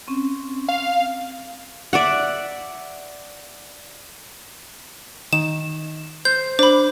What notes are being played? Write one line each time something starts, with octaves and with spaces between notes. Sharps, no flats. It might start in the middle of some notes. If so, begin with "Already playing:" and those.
C4 C#4
F5
D5 E5 F#5
D#3 E7
C5 G6
D4 C5 B5